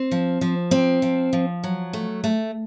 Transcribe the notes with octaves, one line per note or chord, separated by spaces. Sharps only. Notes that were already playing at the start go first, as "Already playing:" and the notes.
Already playing: C4
F3
F3
C4
F3
F3
F#3
A3
A3